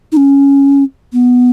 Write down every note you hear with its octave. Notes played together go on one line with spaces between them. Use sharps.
D#4
C#4
B3